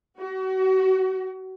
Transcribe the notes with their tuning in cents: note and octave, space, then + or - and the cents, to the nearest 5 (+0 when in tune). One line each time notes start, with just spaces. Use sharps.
F#4 +35